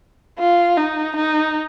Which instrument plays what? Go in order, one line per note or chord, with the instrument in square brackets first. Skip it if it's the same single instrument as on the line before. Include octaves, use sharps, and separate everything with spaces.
[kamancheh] F4
D#4
D#4